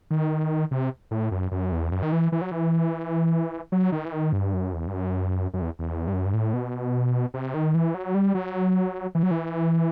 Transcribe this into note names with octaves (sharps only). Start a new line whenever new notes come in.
D#3
C3
A2
F#2
F#2
E2
F#2
D#3
E3
E3
F#3
E3
F#3
D#3
E3
D#3
G2
F#2
E2
G2
F#2
F#2
E2
E2
G2
F#2
G2
A2
B2
C3
D#3
E3
F#3
G3
F#3
E3
F#3
E3